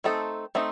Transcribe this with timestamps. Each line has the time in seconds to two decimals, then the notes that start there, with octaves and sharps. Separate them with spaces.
0.04 A3 C4 D#4 A4
0.55 A3 C4 D#4